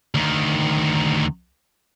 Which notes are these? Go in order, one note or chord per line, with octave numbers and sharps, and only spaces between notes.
D2 D#3